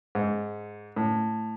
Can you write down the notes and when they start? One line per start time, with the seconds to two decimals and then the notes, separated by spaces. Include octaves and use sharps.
0.15 G#2
0.96 A2